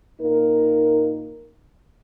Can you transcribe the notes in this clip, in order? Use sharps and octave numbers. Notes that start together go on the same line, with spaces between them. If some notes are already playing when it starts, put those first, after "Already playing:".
A#2 A#3 D#4 A#4